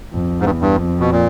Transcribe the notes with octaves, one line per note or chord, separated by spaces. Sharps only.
F2
G#2
E2 G2
G2
F2
B2
A#2